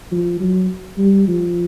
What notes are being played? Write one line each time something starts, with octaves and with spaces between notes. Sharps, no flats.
F3
F#3
G3
F3